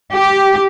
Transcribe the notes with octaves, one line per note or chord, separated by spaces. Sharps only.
G4